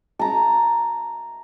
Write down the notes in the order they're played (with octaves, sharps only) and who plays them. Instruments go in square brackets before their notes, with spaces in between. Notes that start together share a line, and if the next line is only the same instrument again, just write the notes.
[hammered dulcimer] A5 A#5